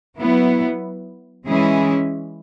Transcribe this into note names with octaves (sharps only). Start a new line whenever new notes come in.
F#3 B3 E4
E3 G#3 C#4 E4 G#4